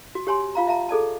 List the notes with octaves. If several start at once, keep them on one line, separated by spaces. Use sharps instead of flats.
F#4
G4 C#5 G#5 C6
F4 F5 A#5
E5 F5 A5 A#5
G#4 A4 D5 A5